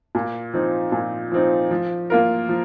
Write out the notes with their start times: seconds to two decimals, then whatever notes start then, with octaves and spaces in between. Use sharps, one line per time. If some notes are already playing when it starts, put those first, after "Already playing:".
0.15 A#2
0.54 F3 C4 D#4
0.92 A#2
1.32 F3 C4 D#4
1.71 F3
2.10 A#3 F4 A#4
2.49 F3